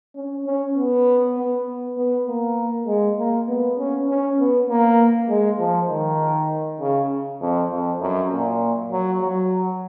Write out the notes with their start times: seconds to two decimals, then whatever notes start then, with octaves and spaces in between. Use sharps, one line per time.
0.16 C#4
0.46 C#4
0.77 B3
1.37 B3
1.98 B3
2.28 A#3
2.87 G#3
3.19 A#3
3.48 B3
3.78 C#4
4.09 C#4
4.39 B3
4.69 A#3
5.29 G#3
5.59 F3
5.90 D#3
6.81 C#3
7.41 F2
7.71 F2
8.01 F#2
8.31 A#2
8.92 F#3
9.21 F#3